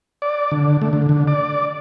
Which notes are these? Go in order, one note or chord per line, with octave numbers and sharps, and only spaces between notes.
D5
D3
A3
D3
D3
D5